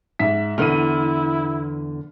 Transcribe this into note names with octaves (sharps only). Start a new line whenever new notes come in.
G#2 E5 B6
E2 D3 E4 F6 D#7